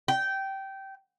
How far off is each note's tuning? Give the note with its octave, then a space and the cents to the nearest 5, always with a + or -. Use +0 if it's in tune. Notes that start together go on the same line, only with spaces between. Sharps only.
G5 -15